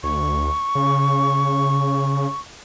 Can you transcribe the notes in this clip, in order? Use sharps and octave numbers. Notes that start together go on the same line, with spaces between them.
D2 C#6
C#3